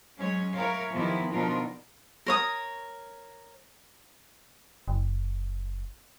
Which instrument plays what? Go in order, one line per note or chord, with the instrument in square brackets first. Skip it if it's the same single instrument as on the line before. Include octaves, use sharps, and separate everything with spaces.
[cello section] F#3 G#3 C#4 C#5
E4 A#4 C#5 F5
D#3 F3 B3 D#4 E4 G4
B2 F3 D4 D#4 F4 A#4
[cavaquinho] A#4 C#5 D#6
[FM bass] F#1